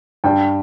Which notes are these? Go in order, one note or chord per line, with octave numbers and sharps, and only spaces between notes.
G2 G5